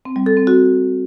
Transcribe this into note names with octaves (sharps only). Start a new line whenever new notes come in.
C4
G3
A4
C4
F#4